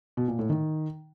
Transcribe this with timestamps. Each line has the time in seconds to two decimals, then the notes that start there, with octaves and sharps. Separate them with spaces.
0.17 B2
0.28 A#2
0.39 A2
0.50 D#3